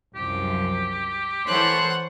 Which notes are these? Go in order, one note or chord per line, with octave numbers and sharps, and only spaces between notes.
C2 F#2 F3 G4
E3 A4 C5 C#5 F#5 F#6